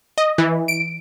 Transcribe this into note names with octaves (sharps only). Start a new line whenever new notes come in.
D#5
E3
D7